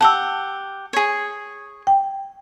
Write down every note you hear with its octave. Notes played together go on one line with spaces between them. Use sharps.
G4 F#5 A5 E6
G#4 C#5
G5